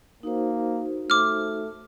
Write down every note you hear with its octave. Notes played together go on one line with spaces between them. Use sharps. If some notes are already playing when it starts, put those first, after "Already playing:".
A#3 D#4 F#4 C5
A3 D6 F6